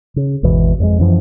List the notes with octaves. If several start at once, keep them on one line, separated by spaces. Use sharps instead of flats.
C#3
G#1 E2 B2 E3
F2 G3 G#3
F#2 E3 F3